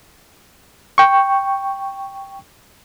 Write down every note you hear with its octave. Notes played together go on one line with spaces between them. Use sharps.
G5 C#6